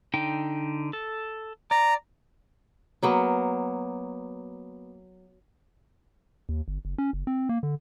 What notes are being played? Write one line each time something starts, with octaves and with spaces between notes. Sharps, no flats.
D3 D#4 G5
A4
D5 A#5
F#3 A#3 B3
D#2
G1
F#1
C#4
F#1
C4
A#3
D3